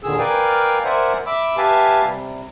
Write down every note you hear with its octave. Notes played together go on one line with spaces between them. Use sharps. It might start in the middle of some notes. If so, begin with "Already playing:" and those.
D#2 A#2 D3 D#3 G#4 E6
A#4 B4 D5 F5 G5 G#5
A#4 C5 D5 E5 F#5 G#5
E5 B5 D6 E6
G4 B4 E5 F5 G#5 A5
C3 G3